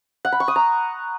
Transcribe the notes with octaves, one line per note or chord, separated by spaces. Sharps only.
F#5
B5
C#6
D#6
A#5